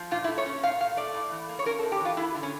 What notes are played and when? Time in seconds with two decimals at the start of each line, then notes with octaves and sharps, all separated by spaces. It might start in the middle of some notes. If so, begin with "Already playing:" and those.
Already playing: F3
0.11 A#2 F4
0.24 E4
0.28 A3
0.38 C#5
0.46 C#4
0.63 A#2 F5
0.80 A#2 F5
0.97 A3 D5
1.14 A2
1.31 E3
1.49 A#3
1.59 C#5
1.66 C#4 A#4
1.79 A4
1.83 A2
1.92 G4
2.00 E3 F4
2.17 G2 E4
2.35 D3
2.43 C#4